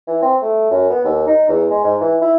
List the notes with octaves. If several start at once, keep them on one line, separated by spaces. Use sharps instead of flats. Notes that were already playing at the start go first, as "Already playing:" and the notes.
E3
C4
A3
F#2
B3
D#2
D#4
E2
G#3
G#2
E3
E4